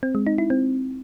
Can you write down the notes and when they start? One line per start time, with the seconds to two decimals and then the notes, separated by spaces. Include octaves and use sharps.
0.03 C4
0.15 G#3
0.27 D#4
0.38 E4
0.50 C4